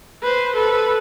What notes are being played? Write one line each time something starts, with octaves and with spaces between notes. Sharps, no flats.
B4 C5
A4 B4